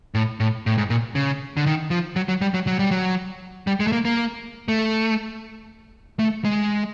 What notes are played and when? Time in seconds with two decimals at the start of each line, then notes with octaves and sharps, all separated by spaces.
0.15 A2
0.40 A2
0.66 A2
0.78 G#2
0.90 A#2
1.15 C#3
1.57 D3
1.66 D#3
1.91 F3
2.16 F#3
2.28 F#3
2.41 G3
2.54 F#3
2.67 F#3
2.79 G3
2.91 F#3
3.67 G3
3.80 G#3
3.87 A3
3.92 A#3
4.05 A#3
4.68 A3
6.19 A3
6.45 G#3